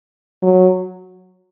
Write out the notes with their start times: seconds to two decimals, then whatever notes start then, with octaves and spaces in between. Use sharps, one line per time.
0.43 F#3